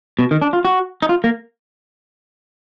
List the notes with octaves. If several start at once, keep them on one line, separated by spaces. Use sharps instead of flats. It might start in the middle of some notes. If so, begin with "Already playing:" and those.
B2
D#3
D4
F4
F#4
D#4
F4
A#3